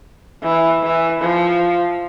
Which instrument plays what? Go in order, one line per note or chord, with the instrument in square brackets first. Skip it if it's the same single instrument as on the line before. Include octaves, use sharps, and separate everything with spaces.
[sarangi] E3
E3
F3